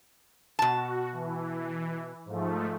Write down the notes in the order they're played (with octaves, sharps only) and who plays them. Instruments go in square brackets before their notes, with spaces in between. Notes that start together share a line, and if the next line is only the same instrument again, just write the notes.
[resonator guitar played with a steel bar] B2 A5 [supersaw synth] F#4
[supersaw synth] E3
G#2 F3 A3